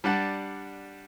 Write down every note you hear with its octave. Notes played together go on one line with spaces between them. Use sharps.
G3 D4 F#5 A5